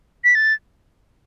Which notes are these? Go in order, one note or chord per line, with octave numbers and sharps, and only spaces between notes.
B6
A6